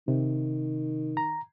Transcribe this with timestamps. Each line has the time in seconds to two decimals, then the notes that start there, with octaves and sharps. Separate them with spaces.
0.08 C3 D#3
1.17 A#5